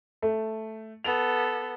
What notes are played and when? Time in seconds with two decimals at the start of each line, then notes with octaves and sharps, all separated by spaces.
0.22 A3
1.04 B3 A4 F7